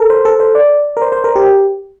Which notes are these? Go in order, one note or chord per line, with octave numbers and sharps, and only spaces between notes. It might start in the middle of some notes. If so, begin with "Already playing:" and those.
Already playing: A4 A#4
C5
A4
C5
D5
A#4
C5
C5
A#4
G4